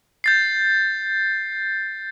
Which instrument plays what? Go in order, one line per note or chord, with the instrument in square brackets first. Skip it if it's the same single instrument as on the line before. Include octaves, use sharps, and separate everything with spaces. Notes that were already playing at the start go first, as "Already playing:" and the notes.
[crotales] G6 A6 C7